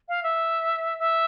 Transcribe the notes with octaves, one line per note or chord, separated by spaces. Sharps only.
F5
E5
E5